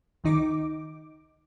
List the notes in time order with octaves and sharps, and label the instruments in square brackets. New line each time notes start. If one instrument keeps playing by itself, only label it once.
[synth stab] C#2 D#3 D#4 D6